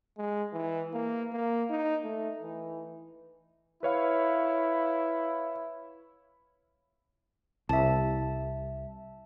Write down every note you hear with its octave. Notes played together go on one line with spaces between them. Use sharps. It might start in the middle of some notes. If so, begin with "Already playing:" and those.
G#3
E3
A#3
A#3
D#4
A3
E3
E4 B4 C#5 F5
C2 E5 A5